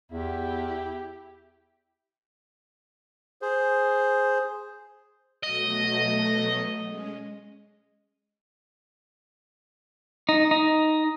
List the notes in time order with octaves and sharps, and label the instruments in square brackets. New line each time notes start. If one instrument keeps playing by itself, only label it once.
[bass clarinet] E2 [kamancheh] E4 G4
[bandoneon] G#4 C5
[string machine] B2 F#3 A3 [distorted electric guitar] D#5
[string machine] G#3 C#4
[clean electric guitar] D#4
D#4